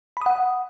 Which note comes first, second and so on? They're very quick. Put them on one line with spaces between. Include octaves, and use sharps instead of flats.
B5 D#6 F#5